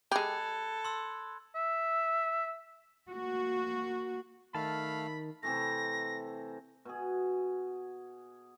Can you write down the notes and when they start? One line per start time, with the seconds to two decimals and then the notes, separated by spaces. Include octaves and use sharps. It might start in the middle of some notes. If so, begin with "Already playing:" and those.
0.12 G#3 G4 A4 B5 F#6 G#6
0.85 C6 E6
1.55 E5
3.09 A#3 F#4
4.55 D#3 A3 F5 A5 B5 F6
5.43 C3 E3 A3 A#6
6.85 B2 G#4